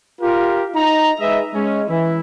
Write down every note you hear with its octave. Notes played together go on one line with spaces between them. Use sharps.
F4 G4 A#4
D#4 A#5
G#3 G#4 B4 D#5 E5
G#3 C#4
E3 E4